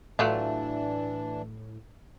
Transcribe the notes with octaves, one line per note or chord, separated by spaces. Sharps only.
A2 E3 F#3 A3 D4 F4